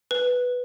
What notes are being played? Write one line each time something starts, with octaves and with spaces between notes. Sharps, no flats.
B4